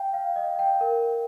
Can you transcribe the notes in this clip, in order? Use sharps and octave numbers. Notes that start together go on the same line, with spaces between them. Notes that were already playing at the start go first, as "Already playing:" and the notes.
Already playing: F5 G5
F5
D#5
G5
A#4